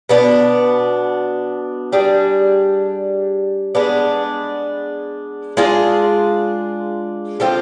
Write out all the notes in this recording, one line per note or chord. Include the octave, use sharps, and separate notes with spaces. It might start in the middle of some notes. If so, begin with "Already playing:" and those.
B2 B3 D4
G3 D4 G#4
G#3 B3 D4
G#3 D4 F4 G#4
D3 F3 C4 F4